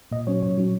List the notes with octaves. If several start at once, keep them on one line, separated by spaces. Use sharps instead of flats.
A#2 D#5
F#3 C#4 C#5
A#2 C#5
F#3 C#4